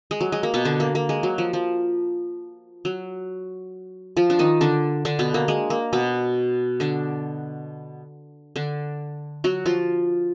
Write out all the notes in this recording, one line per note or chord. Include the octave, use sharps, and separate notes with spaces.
G#3
F#3
G#3
A#3
B2 B3
D3 D4
A#3
A#3
G#3
F#3
F3
F3
F#3
F3 F4
D4
D#3 D#4
D3 D4
D3 D4
B2 B3
A#3
G#3
A#3
B2 B3
D3 D4
D3 D4
F#3 F#4
F3 F4